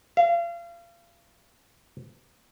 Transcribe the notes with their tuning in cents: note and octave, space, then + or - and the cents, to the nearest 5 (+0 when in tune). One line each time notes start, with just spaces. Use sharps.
F5 -35